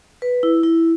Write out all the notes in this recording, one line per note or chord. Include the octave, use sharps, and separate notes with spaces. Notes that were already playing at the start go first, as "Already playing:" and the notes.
B4
E4
E4